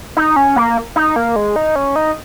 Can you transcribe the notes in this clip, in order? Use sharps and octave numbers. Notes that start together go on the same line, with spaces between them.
D#4
C#4
A#3
D#4
A#3
G#3
D#4
C#4
D#4